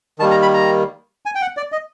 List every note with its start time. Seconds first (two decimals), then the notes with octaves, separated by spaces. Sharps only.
0.19 D#3 G3 A#3 A5
0.31 A#5
0.42 B5
0.54 A#5
1.26 G#5
1.35 G5
1.42 F#5
1.57 D5
1.72 D#5